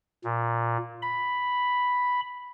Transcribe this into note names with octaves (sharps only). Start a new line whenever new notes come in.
A#2
B5